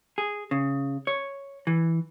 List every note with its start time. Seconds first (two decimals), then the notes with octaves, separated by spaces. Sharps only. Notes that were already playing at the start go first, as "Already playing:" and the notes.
0.18 G#4
0.51 C#3
1.07 C#5
1.67 E3